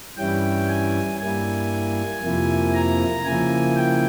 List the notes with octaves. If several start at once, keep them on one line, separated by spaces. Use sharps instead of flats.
G2 E3 G3 C#4 E4 G5
G#5
G2 G3 A#3 E4 G#5
F2 C3 F3 A#3 E4
A#5
C#3 F3 A#3 E4 G#5
G5